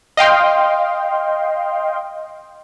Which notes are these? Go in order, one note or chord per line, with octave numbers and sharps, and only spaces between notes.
D#5 F5 G5 C6